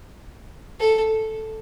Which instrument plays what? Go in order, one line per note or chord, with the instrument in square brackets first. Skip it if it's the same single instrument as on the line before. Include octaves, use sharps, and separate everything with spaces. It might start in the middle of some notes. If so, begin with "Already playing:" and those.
[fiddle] A4